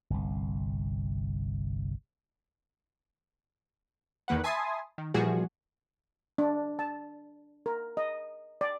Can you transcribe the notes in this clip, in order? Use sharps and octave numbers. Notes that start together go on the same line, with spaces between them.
G1 C2
E2 D#3 A#3 B4 F#5
E5 G#5 A5 B5 C6 D#6
D#3
A#2 E3 F3 G3 F#4 G#4
D4
A5
A#4
D#5
D5